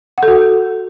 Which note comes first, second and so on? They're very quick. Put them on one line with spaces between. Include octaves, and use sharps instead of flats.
F#5 A4 F#4